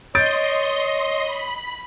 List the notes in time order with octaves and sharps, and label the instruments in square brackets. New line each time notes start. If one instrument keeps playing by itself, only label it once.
[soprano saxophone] C#5 [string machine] D#5 C6 [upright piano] G6 A6 D7
[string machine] B5